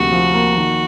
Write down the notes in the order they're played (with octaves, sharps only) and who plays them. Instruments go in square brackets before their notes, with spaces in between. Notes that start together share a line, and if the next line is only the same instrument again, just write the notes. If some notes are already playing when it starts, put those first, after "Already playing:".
Already playing: [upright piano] D2 C3 F3 A#3 [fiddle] F#4
[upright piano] F3
A#3
D#3